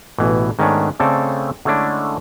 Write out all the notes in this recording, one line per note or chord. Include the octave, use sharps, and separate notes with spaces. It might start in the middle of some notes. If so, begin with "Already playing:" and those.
A1 B2 E3
G#2 D#3 A3 B3 C#4 D4
C#3 A3 C4 A4 D5
D3 G#3 A3 C#4 D4 E4